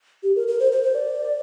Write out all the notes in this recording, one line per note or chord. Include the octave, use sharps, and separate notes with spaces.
G4
A#4
A#4
C5
C5
C5
D5